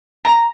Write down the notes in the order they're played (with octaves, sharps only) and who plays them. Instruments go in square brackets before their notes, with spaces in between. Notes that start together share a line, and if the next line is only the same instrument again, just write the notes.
[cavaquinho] A#5